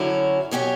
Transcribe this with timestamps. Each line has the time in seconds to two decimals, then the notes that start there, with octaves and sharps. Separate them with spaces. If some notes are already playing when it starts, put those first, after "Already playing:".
Already playing: F#2 D3 F#3 C#4 E4
0.51 B2 F#3 C#4 G4 C#5